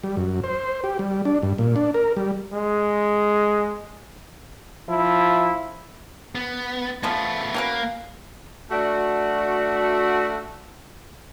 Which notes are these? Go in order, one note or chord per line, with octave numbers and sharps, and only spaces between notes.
G3
F#2
C5
G4
G3
D4
G2
A#2
D4
A#4
G3
G#3
F3 E4
B3
F3 G#3 A3 B3
F#3 A#3 C#4 B4
A3 D4 F#4